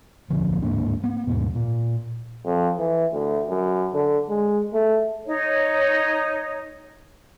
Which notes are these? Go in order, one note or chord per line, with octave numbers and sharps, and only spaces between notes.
D1 B1 D3 F3
D1 G#2 A#3 D4
A#3 B3
D#2 G#2 B2
A#2
F2
E3
D2
F#2
D3
G#3
A3
D#4 C#5